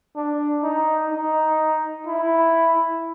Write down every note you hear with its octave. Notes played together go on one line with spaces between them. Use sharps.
D4
D#4
D#4
E4